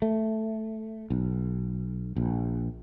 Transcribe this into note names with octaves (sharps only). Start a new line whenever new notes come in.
A3
B1
A#1